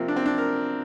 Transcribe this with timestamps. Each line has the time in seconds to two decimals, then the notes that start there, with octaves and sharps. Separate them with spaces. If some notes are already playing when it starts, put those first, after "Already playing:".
Already playing: C3 F3 A#3 C4
0.08 D4
0.16 C4
0.26 D4
0.38 A#4